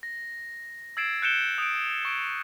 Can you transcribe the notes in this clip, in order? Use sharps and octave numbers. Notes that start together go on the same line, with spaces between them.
A#6
E6 G#6 A6 C7 D7 E7
F#6 G6 C#7 D7 E7 G7
D#6 D7
C#6 D7